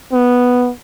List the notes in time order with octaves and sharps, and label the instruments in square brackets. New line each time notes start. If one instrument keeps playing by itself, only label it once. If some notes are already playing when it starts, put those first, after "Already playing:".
[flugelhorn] B3